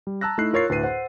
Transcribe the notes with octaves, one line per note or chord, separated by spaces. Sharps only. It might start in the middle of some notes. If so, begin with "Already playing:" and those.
G3
A5 A#5 E6 F#6 A#6
A3 D#4 E4 F#6 C7
F4 A#4 C#5 C#6 A6 C7
D2 A2 B4 C7 D#7
C5 F#5